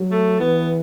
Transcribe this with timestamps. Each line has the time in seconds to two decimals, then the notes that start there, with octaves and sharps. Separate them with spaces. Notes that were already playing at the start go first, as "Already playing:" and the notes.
Already playing: F#3
0.11 A3
0.40 E3 B3